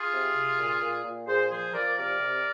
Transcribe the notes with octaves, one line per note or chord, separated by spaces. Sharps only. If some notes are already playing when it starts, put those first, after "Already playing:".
Already playing: F4 G#4
C3
C3
A#2
A#2
A#2
A#2 G#4 C5
F3 G#4 C5
F3 A#4 D5
C3 A#4 D5
C3